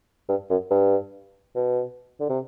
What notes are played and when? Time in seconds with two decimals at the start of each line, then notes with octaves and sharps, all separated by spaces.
0.29 G2
0.50 F#2
0.71 G2
1.55 B2
2.20 D3
2.29 C3